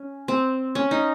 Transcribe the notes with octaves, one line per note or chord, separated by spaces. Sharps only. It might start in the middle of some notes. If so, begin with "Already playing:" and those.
Already playing: C#4
C4
C#4
D#4